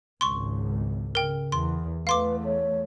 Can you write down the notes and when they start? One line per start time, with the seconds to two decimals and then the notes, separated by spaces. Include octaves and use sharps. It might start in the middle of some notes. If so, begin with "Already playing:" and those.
0.21 G#1 C#2 C6 C#6
1.15 C#3 A#4 G5
1.52 E2 C6
2.07 E2 A3 B4 F5 C6 D6
2.45 C#5